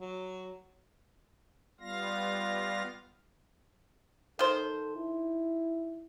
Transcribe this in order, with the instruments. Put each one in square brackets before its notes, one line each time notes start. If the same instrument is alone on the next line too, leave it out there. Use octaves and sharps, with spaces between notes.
[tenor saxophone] F#3
[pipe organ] G3 B3 F4 F5 A#6
[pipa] D#3 C5 [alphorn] A4
[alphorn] E4